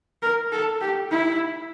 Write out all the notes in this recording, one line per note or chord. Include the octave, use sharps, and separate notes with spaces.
A#4
A4
G4
E4